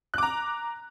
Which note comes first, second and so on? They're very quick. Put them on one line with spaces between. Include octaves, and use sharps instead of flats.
F#6 D6 A#5